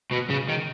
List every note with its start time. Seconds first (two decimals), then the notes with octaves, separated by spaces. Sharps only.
0.12 B2
0.30 C#3
0.49 D#3